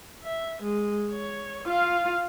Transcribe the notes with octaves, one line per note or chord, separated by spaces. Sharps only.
E5
G#3
C#5
F4 F5